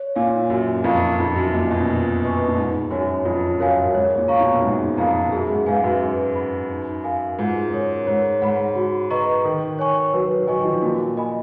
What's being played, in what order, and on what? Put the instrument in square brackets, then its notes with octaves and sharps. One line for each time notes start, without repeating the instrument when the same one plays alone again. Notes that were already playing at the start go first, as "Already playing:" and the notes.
Already playing: [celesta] C#5
[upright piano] A#2 [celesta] F5 G#5
[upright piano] F#2 [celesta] A#4
[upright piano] F2 [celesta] F5 A#5 C#6
[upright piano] F2 [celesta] D#4
[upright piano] F#2
[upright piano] A#2 [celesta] A#4 D#5
[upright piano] B2
[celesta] F4
B4 D#5 G#5 C#6
[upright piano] A#2
[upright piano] G#2 [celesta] D#4
[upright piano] F#2 [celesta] F#4 C#5 G#5
[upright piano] F2 [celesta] F4
[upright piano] F#2 [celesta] A#4 C#5 F5 G#5
[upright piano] F#2
[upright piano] G#2 [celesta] C#5
[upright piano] A#2
[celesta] F5 A#5 C#6
[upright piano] B2
F#2
[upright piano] G#2 [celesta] D#4
[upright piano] F2 [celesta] A#4 F5 A#5
[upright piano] F#2 [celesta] G#4
[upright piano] G#2
[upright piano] G#2 [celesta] B4 F5 G#5
[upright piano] F#2
[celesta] B4
F#5 B5
D#4
A#4 F5 G#5
[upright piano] G#2 [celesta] F4
[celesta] A#4 C#5
[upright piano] G#2 [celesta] C#5
[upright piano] G#2 [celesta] F#5 B5
[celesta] F#4
B4 D#5 A#5 C#6
[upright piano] D#3 [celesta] A#4
[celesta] C#5 G#5 C#6
[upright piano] F#3 [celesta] B4
[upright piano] F#3 [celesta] D#5 G#5 C#6
[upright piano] D#3
F3
[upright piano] A#2 [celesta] F#4
[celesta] A#4 D#5 G#5 B5